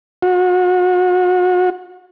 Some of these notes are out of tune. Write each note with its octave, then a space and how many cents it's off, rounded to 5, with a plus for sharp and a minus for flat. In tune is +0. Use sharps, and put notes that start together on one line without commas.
F#4 -35